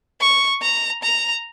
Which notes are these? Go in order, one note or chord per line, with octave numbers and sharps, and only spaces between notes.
C#6
A#5
A#5